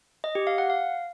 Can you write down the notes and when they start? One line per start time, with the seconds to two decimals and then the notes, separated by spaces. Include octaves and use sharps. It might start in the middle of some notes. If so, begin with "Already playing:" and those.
0.24 D#5
0.35 G4
0.47 F5
0.58 F#5
0.70 F5